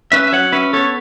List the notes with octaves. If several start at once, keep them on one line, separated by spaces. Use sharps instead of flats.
C#4 B4 E5
E5
F#3 C#5 F#5
C#4 B4 E5
B3 A4 C#5